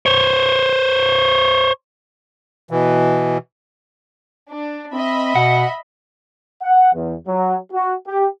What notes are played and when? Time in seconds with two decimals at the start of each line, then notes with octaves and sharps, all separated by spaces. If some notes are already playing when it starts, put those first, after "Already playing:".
0.06 C5 C#5
2.71 B2 E3
4.50 D4
4.93 C4 D#5 E5 B5
5.35 B2 F#5
6.63 F#5
6.94 E2
7.27 F#3
7.73 F#4
8.07 G4